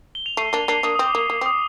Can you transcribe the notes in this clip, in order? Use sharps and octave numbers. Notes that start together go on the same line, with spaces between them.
G7
F7
A3 C7 D#7
A#3 D4
A#3 D4 C7
A#3 D4 D#6
D#6
C4
D6
A#3 D#6
A#3
C4
D#6